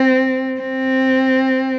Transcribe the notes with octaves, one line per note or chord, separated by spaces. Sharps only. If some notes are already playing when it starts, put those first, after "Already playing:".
Already playing: C4
C4